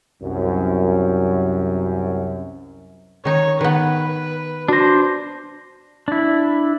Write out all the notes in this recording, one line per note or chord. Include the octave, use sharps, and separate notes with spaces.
C2 F#2
D#3 D#4 C#5
D#3 B3 B4
D4 F#4 C5 A#6
D4 E4